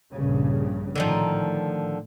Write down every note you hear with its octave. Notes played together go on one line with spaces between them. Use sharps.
A#1 G2 C#3
A2 D3 D#3 F3